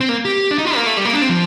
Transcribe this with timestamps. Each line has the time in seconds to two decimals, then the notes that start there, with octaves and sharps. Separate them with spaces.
0.01 C4
0.09 A#3
0.25 G4
0.51 D4
0.58 D#4
0.65 F4
0.75 A#3
0.86 A3
0.97 G3
1.05 A#3
1.13 D4
1.22 C4
1.29 F3